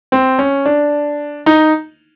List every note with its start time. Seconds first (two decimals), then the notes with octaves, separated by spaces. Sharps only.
0.12 C4
0.39 C#4
0.66 D4
1.46 D#4